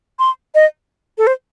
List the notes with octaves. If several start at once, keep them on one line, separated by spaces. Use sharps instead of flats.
C6
D#5
A4
C5